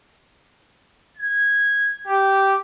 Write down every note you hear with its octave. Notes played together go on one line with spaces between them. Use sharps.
G#6
G4